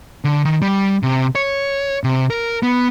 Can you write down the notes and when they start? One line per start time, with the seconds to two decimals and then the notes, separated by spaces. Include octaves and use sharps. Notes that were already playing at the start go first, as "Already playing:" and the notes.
0.24 D3
0.45 D#3
0.62 G3
1.03 C3
1.35 C#5
2.04 C3
2.30 A#4
2.63 B3